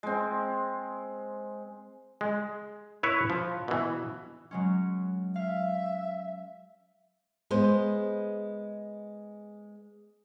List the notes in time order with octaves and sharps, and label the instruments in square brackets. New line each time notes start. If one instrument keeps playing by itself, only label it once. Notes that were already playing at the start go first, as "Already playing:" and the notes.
[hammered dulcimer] G#3 C4
[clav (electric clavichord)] G#3
E4 B4 C#5 E5
F3
B2 E3
[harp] F#3 G#3 C#4
[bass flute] E5 [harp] F5
[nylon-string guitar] G#3 B3 C5